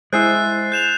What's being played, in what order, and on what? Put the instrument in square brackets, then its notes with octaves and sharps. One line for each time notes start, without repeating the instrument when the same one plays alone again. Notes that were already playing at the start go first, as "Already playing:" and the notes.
[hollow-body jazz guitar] G#3 E4 [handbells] C5 G#5 E6 [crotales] F#6 A6 C7
[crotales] G6 E7 F7